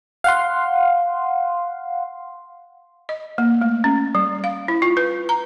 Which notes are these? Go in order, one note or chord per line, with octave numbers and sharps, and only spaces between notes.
F5 F#5 C6
D#5
A#3
A3
C#4
G3
F5
E4
F4
B4
A#5